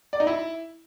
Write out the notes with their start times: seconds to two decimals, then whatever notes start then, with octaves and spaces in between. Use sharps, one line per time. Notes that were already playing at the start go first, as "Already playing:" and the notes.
0.13 D5
0.20 D#4
0.27 E4